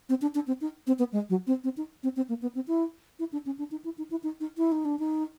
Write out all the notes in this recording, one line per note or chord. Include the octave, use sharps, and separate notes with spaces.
C4
D4
D4
C4
D#4
C4
B3
G#3
F#3
C4
C4
D#4
C4
C4
A#3
B3
C4
E4
E4
D4
C#4
D4
D#4
E4
D#4
E4
D#4
D#4
E4
D#4
D4
D#4